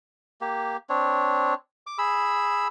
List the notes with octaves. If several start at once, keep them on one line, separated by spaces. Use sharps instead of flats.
A#3 G4
C4 D4 C#5
D6
G#4 B5 E6